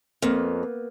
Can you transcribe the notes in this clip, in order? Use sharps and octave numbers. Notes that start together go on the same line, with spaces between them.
F2 A#3 B3